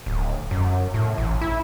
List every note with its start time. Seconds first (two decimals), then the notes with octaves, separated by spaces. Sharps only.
0.06 D1
0.51 F#2
0.94 A2
1.18 A1
1.41 E4